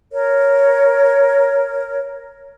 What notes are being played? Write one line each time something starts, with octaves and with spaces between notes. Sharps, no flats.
A#4 C#5